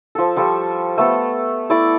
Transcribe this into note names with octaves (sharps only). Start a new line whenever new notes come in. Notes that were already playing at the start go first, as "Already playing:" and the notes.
F3 A4
F3 G3 A4 C#6
A3 B3 A4
A3 E4 A4 D5